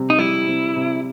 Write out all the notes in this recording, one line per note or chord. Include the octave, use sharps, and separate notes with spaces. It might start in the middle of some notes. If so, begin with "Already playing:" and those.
Already playing: C3 G3
D#4
G3 E4
C3
C3